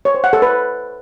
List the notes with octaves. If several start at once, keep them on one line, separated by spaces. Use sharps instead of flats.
C#5
C5
F#5
A4
B4